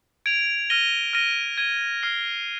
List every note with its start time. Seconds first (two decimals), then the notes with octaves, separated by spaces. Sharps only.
0.26 G#6 D7 F7
0.70 F6 A#6 D#7 G7
1.13 F6 A#6 D#7 G7
1.58 G#6 D#7 G7
2.03 F6 C7 G7